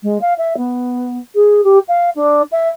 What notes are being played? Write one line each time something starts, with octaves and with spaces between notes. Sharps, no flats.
G#3
F5
E5
B3
G#4
G4
F5
D4
E5